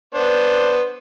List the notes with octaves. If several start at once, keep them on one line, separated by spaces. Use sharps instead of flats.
B3 D4 C5